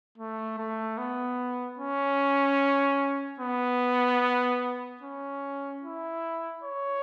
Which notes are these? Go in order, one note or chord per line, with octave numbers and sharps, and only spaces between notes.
A3
A3
B3
C#4
B3
C#4
E4
C#5